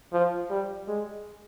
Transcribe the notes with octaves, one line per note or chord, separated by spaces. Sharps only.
F3
G3
G#3